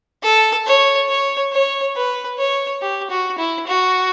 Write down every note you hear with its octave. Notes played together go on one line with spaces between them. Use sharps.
A4
C#5
C#5
C#5
B4
C#5
G4
F#4
E4
F#4